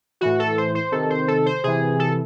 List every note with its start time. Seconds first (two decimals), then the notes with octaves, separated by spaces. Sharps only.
0.21 A2 E3 F#4
0.39 A4
0.58 C5
0.75 C5
0.92 C3 D#3 A4
1.10 C5
1.28 A4
1.46 C5
1.64 C3 E3 G#4
1.99 A4